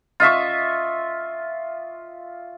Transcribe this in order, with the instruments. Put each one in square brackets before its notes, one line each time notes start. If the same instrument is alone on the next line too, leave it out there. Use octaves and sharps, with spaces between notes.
[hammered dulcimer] F4 D#5 E5 C#6